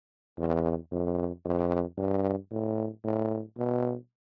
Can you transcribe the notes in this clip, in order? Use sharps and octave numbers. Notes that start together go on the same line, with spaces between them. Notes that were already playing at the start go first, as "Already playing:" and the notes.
E2
F2
F2
G2
A2
A2
B2